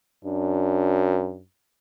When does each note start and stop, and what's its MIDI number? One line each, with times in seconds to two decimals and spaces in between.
0.25 1.43 42
0.25 1.40 62